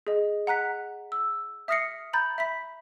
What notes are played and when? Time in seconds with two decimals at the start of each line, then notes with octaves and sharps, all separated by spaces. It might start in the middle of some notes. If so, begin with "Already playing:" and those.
0.07 G#4 D#5
0.47 F#5 A#5 F#6 B6
1.12 E6
1.68 E5 D#6 F6 A#6 C7 C#7
2.13 A#5 B5 G6 A6
2.38 E5 B5 B6